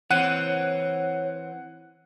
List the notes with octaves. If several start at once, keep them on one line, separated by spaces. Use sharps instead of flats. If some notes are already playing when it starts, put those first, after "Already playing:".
E3 C4 C#5 F#5 F#6 D#7